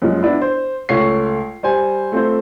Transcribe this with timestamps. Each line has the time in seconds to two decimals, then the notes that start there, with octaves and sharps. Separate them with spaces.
0.02 F#2 A#2 F3 G#3
0.23 B3 D4 E4
0.42 C5
0.89 C#2 A3 C#5 C7
1.63 G3 C5 G#5
2.12 A3 C4 F4 C5